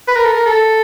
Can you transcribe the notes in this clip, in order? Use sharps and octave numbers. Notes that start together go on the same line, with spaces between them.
B4
A#4
A4
A#4
A4